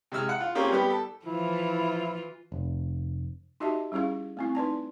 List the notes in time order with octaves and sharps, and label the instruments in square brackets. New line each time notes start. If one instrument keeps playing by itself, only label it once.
[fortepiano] C3 G#3 E6 F6
F#5
F4
A#3 C4 C#4 F4 G4 G#4
G3 B3 G4
A4
[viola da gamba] E3 F4 [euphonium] F3 [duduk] E4
[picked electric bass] F1
[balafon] D#4 F#4 G4 D#5 E5 A5
G3 C#4 E4 G#4 F5
A3 C4 E4
D#4 B4 D5 A5